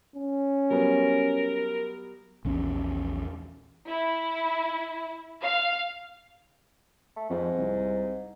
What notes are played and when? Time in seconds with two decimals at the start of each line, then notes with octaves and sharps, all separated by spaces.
0.16 C#4
0.71 F#3 G3 B3 A#4
2.45 A#1 E2 C#4
3.87 E4
5.41 F5
7.16 A3
7.30 F2 G#2
7.58 C2